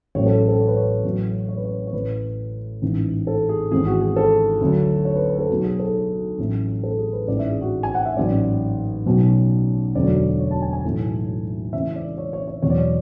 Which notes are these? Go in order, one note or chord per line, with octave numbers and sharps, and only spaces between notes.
A1 A2 F#3 C#5
A4
A4
C#5
B4
C#5
A1 A2 F#3
C#5
B4
C#5
C#5
A1 A2 E3 B4
A1 G#2 E3
A4
G#4
G#1 G#2 E3 G#4
F#4
G#4
A4
D2 D3 F#3
C#5
B4
B4
A4
B1 B2 F#3 F#4
G#4
A4
A1 A2 F#3
A4
G#4
B4
A1 G#2 E3 D5
E5
G#4
F#4
G#5
F#5
E5
A1 G#2 F#3 D5
B1 B2 F#3
E1 D2 D3 F#3 D5
C#5
A5
G#5
G#5
B1 A2 E3
C#2 C#3 E3 E5
D5
C#5
C#5
C#5
E2 B2 F#3 C#5
D5
C#5